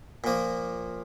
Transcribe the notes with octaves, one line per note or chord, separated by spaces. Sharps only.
A#2 F3 A#3